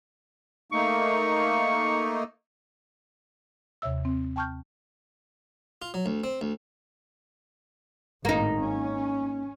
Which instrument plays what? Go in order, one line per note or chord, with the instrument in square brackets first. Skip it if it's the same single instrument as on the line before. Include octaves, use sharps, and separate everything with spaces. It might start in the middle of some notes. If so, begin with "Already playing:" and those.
[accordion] A3 A#3 D#4 [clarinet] C#6
[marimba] D#2 C3 C#5 E5 E6
C4
G5 A5 C#6 F6 G6
[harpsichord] F4
F#3
D2
C4
D2
[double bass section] G#1 A2 [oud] A#3 D#4
[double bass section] C#4